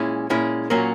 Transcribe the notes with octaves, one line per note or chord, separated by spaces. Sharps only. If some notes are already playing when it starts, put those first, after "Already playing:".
Already playing: A#2 G#3 C#4 E4
A#2 G#3 C#4 E4
A#2 F#3 A#3 C#4